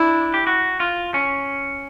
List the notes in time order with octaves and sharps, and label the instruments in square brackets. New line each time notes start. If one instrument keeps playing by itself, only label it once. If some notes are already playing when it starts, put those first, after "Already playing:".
Already playing: [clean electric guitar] D4 [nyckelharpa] E4
[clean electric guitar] G4
F#4
F4
C#4